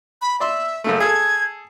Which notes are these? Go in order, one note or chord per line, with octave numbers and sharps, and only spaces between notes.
B5
D5 E5 C6
F#2 C#3 A3
G#4 A4 G#6